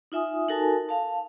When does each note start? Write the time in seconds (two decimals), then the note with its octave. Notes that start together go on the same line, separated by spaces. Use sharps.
0.12 D#4 F4 E5 G#5 D#6
0.49 D#4 F#4 A4 A#4 G#5 A5
0.89 F5 A5